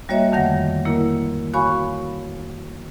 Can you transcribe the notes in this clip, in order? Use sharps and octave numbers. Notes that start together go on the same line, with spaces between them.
G3 A#3 F#4 C#5 D#5 E5
F2 D3 D#3 A3 F#5 A#6
A#3 E4 A#4
F#4 C#5 F5 G#5 B5 C#6